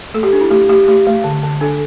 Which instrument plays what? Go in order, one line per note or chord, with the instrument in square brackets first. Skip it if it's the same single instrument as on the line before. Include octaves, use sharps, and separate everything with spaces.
[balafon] A3 A4
G4
D4
E4
A3 G4
A3 G4
A3 G4
A3
D3
D3
D4 A4